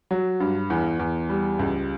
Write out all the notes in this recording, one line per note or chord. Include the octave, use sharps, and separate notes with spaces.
F#3
G2
E2
E2
G3
C#2